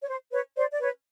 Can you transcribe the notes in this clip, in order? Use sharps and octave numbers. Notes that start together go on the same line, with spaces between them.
C#5
C5
B4 C#5
C5 D5
D5
B4 C#5